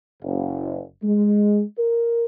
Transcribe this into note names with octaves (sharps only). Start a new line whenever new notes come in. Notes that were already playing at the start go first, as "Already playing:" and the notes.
F#1
G#3
A#4